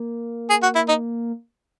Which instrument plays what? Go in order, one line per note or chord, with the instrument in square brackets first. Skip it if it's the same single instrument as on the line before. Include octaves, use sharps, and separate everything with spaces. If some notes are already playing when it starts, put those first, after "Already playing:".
Already playing: [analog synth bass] A#3
[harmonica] G#4
F#4
E4
D#4